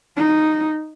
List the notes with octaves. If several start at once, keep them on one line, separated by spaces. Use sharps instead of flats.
D#4